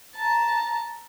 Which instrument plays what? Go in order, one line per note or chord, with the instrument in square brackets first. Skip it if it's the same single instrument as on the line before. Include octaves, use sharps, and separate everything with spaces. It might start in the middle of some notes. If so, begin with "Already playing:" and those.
[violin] A5 A#5